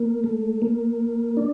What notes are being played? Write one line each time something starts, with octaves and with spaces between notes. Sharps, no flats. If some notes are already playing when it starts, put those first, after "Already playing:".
Already playing: A#3
A3
A#3
D4